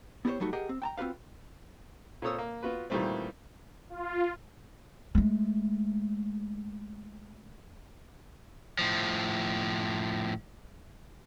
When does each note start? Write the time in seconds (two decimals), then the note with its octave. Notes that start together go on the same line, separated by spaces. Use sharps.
0.25 B3 E4 G4 A#4 C5 C#5
0.40 F#3 G3 A3 D#4 F#4
0.53 G4 G#4 A#4 D#5 F#5
0.69 C4
0.82 G5 A5 A#5
0.98 C4 F4 F#4 B4 F5
2.22 A#2 C4 A4 C#5 D#6 E6
2.38 A#3
2.63 B3 F4 F#4 B4
2.90 A#2 D#3 E3 G3 A3 C4
3.90 F4
5.15 G#3 A3
8.79 A2 F3